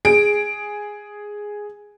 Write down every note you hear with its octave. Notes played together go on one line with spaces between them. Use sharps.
G#4 D7